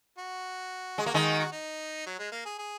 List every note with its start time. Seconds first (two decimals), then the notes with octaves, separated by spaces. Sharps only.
0.18 F#4
0.98 G#3
1.06 A#3
1.14 D#3 G#3
1.40 F#4
1.52 D#4
2.06 F#3
2.19 G#3
2.32 A#3
2.45 G#4
2.59 G#4